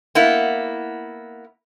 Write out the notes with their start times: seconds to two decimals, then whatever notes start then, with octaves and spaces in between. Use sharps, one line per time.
0.15 A#3 B3 E4